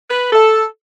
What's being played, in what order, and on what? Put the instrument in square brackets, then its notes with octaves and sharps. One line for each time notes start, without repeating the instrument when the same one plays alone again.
[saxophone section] B4
A4